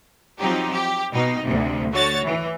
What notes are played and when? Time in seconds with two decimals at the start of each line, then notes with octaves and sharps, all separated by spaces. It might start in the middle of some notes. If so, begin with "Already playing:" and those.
0.39 F3 F#3 C4 D#4 G4
0.72 G4
1.12 B2 D#4
1.42 D2 C3
1.91 D3 A3 F#4 C#5 A6
2.23 E3